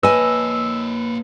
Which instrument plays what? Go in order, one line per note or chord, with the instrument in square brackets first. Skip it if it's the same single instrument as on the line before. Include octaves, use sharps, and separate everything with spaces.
[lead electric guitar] A#3 C#5 [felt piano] B4 [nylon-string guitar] D#5 G#5 [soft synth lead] E6